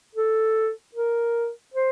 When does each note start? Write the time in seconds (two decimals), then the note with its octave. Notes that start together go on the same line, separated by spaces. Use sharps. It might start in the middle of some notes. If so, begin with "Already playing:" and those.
0.15 A4
0.94 A#4
1.74 C5